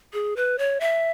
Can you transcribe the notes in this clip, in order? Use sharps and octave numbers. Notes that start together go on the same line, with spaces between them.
G#4
B4
C#5
E5